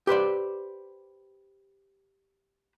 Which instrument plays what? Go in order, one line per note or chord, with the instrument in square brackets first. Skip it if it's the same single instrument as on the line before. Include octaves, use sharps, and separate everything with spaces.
[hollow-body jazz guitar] G4 B4 C5 D5